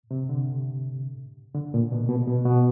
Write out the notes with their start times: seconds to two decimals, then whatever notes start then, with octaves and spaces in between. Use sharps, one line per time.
0.11 C3
0.29 D3
1.55 D3
1.74 A#2
1.92 B2
2.09 B2
2.28 B2
2.45 B2